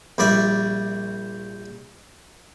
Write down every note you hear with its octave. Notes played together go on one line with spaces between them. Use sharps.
A#1 G3 D5 E5